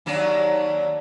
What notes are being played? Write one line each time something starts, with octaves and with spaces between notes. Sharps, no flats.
D#2 F#3 D4